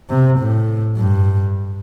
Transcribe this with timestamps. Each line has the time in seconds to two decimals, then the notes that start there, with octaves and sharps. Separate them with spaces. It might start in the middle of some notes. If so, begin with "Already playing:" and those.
0.09 C3
0.39 A2
0.97 G2